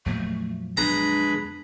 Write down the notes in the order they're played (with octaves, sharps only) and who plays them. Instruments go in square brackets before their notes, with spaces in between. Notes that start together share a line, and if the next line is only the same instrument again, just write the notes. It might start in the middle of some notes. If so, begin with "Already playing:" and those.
[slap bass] F2 A#2 F#3 [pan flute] A3
[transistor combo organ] G#3 B4 [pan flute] D4 [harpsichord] A#5